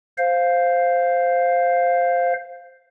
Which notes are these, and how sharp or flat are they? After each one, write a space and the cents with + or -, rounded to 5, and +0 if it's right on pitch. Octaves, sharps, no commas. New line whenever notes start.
C5 +0 F5 +0